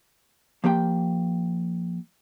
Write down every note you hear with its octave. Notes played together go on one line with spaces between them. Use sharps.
F3 A#3 G4 G5